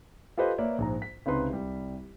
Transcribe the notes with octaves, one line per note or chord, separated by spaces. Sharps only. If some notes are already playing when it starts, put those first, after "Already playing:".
F4 G4 A4 B4 C5 D#5
A#3 B4 C#5 D5 E5
A#1 G#2 A#5
B6
C#2 C3 C#4 D#4 B4 C6
C2 G3